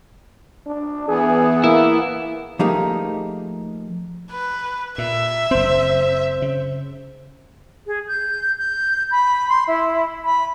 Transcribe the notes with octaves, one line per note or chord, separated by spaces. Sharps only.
D4
E3 B3 G#4
A#3 E4
F3 A3 A#3 D#4 G4 G#4
B4
A#2 E5
F#1 C4 C5
C#3
G#4
G6
G6
B5
C6
E4
B5